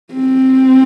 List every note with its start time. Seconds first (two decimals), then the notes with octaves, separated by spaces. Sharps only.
0.13 C4